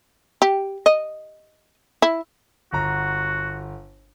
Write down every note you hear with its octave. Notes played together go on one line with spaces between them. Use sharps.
G4
D#5
E4
G1 F#4 A#5